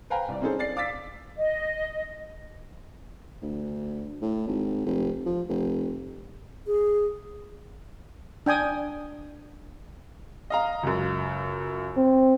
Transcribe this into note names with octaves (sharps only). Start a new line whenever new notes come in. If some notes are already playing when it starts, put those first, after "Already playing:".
B4 C5 F5 G5 G#5 A#5
C2 D5
C4 C#4 D#4 G#4 A4 C5
D5 A6 C7
F5 D6 E6 A6 B6
D#5
D2
A2
G#1
F1
F3
F1
G#4
D4 G5 G#5 D#6
D#5 F5 A#5
C#2 F#2
C4